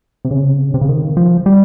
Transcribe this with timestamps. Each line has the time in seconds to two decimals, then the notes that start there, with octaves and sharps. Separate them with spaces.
0.25 C3
0.31 C#3
0.74 C3
0.81 C#3
0.89 D#3
1.17 F3
1.46 G3